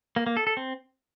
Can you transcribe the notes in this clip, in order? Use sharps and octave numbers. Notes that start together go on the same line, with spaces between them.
A#3
A#3
A4
A4
C4